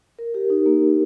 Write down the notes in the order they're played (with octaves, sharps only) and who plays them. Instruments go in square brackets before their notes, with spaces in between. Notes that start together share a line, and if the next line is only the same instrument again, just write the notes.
[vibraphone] A#4
G4
D#4
A#3